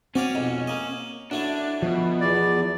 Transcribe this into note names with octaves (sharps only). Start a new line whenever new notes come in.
C4 C#4 F#4 D5 F5
B1 F2 G#2
A#3 D#5
F#2 A3 D4 E4
B2 F3
E2 D5